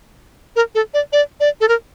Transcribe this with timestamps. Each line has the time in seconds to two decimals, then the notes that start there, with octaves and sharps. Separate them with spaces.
0.56 A#4
0.75 A4
0.94 D5
1.13 D5
1.40 D5
1.61 A4
1.68 A#4